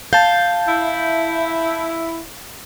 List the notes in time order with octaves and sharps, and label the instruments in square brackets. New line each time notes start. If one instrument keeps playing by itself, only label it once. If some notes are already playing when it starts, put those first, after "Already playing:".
[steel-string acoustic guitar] F5 [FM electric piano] A5 G6
[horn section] E4